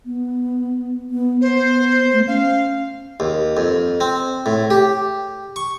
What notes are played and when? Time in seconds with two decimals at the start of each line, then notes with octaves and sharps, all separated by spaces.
0.06 B3
1.11 B3
1.41 B3 C5
2.13 A3
2.27 C#4 F5
3.20 D#2
3.57 F2
4.00 C4
4.46 A2
4.70 G4
5.56 C#6